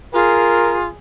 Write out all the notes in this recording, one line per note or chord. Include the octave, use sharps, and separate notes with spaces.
F4 G#4 A#4